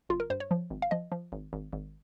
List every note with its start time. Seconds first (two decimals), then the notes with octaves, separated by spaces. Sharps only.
0.09 G1 F4
0.20 A#4
0.30 G2 C5
0.40 C#5
0.51 F3
0.70 G#1
0.82 F5
0.91 F3 D#5
1.12 F3
1.32 G#1
1.53 G#1
1.73 G#1